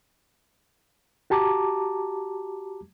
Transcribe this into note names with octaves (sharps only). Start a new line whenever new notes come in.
F#4 G4 A5 A#5 D6